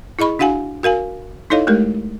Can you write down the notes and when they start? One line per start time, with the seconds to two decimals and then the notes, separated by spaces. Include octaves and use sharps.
0.19 E4 G#4 D#5 B5 C#6
0.39 D4 F#4 F5 F#5 G#5
0.83 F#4 A#4 F5 G#5
1.50 D#4 E4 A4 C#5 D#5 F5
1.67 G#3 A3 G4 A#4